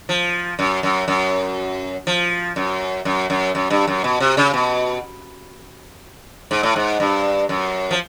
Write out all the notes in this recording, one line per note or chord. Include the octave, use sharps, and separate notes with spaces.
F3
F#2
F#2
F#2
F3
F#2
F#2
F#2
F#2
G2
F#2
B2
C3
C#3
B2
G#2
A2
G#2
G2
F#2
F3